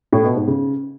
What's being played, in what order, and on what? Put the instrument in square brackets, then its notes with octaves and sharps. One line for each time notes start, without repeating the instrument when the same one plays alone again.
[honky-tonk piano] A2
B2
G#2
C#3